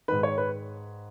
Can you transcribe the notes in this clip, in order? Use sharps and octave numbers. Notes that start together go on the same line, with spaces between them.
G#2 D#3 B4
C#5
B4